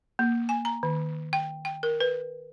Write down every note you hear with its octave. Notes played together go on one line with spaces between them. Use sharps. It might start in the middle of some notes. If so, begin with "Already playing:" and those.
A#3
G#5
A#5
D#3
G5
G5
A#4
B4